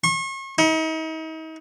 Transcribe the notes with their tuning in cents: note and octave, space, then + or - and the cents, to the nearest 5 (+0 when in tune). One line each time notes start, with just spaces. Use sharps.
C#6 -40
D#4 +40